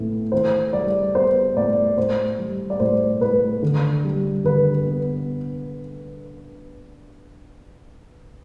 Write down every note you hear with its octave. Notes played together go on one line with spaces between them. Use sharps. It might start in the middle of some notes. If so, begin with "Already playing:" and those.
Already playing: A2 B3
E3 C5
G3 D5
B3 C5
A2 D5
A2 C5
G3
D5
A2 C5
A2 B4
D3
G3
D3 B4
B3